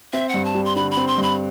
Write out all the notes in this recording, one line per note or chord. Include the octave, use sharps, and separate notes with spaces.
C4 E5
G2 F#5
A5
G3
C6
D3 B5
B5
C4
C6
G2
B5